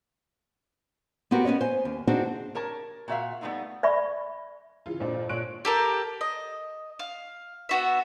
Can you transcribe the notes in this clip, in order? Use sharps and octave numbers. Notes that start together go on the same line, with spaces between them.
B3 C4 F#4 G4 A#4
B3 C#4 C#5 D#5
C5 G#5
D#2
C4 D4 D#4 F#4 G#4 C5
G4 A#4 C#5 A5
A#2 F#4 E5 F5
G3 A3 B3 C4 D#4 E4
D5 E5 B5 C#6
C#3 E3 F4
F2 A#2 D4
A#2 D4 C5 C#5 F#6 D7
G4 A4 A#4
D#5
F5
B3 F#4 E5